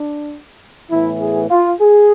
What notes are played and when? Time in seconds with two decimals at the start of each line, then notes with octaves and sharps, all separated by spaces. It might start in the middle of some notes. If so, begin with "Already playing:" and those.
Already playing: D4
0.90 A2 E3 B3 E4
1.20 G#4
1.50 F4
1.80 G#4